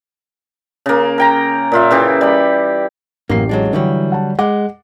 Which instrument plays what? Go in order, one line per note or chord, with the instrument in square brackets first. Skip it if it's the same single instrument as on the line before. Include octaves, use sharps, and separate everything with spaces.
[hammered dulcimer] C#3 A#3
A#4 G5 A#5
A#2 F4 E5
C#3 E3 G4
G3 B5
[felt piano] A1 G4 C7 [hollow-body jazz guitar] F#2 A#3
[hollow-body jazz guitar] F#3 G#3 D4
[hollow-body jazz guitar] D3 F#3 G3 [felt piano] E3
[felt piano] F#5 A5
[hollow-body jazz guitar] G#3 [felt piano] F#5 D6